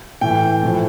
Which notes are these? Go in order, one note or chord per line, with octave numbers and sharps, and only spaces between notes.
A2 E3 G5
A2 F3